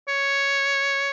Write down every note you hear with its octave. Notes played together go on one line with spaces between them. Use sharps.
C#5